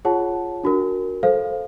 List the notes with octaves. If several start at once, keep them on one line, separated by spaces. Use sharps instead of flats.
F4 G#4 C#5 F#5 A5
D4 F#4 A#4
A4 C5 F5